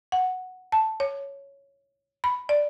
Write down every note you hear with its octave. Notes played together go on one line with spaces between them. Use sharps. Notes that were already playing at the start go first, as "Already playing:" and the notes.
F#5
A5
C#5
B5
D5